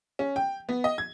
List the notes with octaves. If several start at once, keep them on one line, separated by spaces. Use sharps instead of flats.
C#4
G5
B3
D#5
G#6